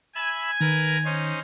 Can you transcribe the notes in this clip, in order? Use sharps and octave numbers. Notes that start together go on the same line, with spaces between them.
E5 G#5 B5 E6
D#3 A#4 B4 A#5
C#4 D#4 C5